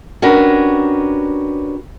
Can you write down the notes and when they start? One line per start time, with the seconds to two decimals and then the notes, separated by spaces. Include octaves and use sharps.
0.22 C#4 D4 F#4 G4 A#4 B4